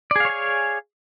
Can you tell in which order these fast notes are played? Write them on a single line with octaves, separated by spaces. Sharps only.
D5 G#4 F5 C#5 G#5